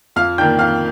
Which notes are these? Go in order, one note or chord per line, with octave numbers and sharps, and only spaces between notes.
F2 F5 F6
D#3 A#3 D4 G5 G6
F2 F5 F6